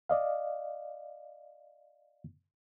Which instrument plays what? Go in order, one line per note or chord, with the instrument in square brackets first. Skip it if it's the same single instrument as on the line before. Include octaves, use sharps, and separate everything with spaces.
[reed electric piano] D5 D#5 F5